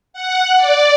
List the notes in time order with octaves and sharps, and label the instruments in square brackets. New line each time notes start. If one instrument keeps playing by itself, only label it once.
[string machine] F#5
D5